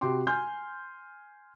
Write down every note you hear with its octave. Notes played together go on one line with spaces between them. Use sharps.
C3 F#4 G5 C6 D6
G#5 C6 F6 G6